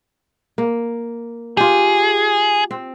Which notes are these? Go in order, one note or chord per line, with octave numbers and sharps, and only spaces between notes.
A#3
F4 G4 G#4
C4